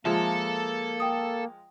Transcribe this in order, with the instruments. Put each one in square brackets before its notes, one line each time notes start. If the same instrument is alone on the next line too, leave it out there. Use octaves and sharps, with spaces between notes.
[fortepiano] F3 G#3 [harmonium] A#3 [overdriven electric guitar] A4 [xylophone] E5
[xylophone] G5 D#6